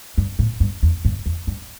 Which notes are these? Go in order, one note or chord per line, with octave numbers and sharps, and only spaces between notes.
G2
A2
G2
E2
G2
E2
G2